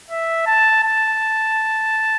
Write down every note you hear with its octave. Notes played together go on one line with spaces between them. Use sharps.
E5
A5
A5